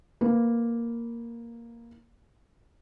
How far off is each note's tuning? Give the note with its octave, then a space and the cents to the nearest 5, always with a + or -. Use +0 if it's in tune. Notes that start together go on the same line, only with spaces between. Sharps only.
A#3 +0 B4 +0